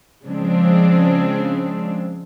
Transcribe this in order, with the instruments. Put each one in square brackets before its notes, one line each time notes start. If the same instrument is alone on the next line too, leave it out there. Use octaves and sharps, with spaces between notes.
[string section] C#3 F3 G#3 C4 D4